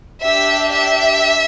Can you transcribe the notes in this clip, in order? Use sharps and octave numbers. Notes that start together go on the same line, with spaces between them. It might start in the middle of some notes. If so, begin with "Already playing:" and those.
D4 G4 E5
E5